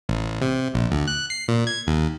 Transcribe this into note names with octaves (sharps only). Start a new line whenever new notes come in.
A1
C3
A#1
D2
F#6
C7
A#2
G#6
D#2